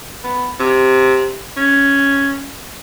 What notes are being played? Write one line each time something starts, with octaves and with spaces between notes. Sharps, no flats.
B3
C3
C#4